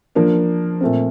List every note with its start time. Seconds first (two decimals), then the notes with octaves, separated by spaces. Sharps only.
0.15 F3 A#3 D4
0.81 A#2 A3 C4